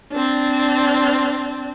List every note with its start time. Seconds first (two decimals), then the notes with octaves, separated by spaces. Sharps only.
0.12 C4 D4